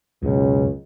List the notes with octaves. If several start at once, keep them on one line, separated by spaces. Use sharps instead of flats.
C#2 F#2 B2